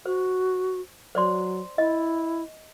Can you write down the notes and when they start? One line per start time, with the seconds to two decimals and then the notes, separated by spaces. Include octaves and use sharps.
0.06 F#4 C5
1.15 F#3 C5 D5 C6
1.78 E4 D#5